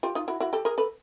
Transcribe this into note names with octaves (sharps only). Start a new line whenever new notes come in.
F4 G4
D#4 F4
E4 F#4
E4 F#4
G4 A4
G#4 A#4
A4 B4